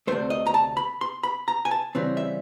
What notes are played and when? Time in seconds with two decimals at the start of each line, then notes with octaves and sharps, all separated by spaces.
0.07 D2 C3 E3 A3 C5
0.30 D#5
0.47 A#5
0.54 A5
0.77 B5
1.01 C6
1.23 B5
1.48 A#5
1.65 G#5
1.71 A5
1.95 C#3 E3 G3 C4
2.17 E5